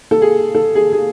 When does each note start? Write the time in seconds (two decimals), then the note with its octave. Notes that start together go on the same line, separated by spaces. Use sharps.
0.11 A4
0.22 G#4
0.55 A4
0.75 G#4
0.92 G#4